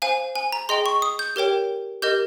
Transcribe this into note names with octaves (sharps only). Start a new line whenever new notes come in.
C5 F5 G#5
G#5
A#5
G#4 D#5 G5 C6
C#6
D#6
G6
G4 A#4 C#5 G5
G4 A#4 D#5 G6